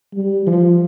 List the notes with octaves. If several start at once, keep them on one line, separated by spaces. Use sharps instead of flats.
G3
F3